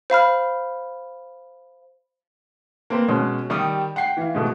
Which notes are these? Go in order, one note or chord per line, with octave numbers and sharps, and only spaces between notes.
C5 F5 B5 F6
A#3 C4 B4
B2 G#3 C#4
D#3 G3 G4 G5 D#6
F#5 G5 C7
E3 F5
G#2 B2 A3